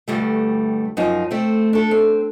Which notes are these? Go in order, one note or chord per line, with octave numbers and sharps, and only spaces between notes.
D2 G2 G3 A3
F#2 F3 D#4
A3 C4
D4 A4
C4